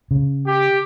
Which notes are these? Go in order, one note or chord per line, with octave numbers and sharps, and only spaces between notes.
C#3
G4